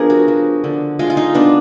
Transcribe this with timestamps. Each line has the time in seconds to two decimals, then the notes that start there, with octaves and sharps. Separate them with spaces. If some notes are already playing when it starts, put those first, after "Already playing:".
Already playing: F3 B3 D4 G#4 A#4
0.10 F#4
0.28 F3
0.64 D3
0.99 G#3 F4
1.10 F4
1.17 D#4
1.34 B3 D4